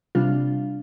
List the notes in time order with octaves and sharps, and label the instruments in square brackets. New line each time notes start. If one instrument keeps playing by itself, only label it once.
[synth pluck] C3 G3 D4 F4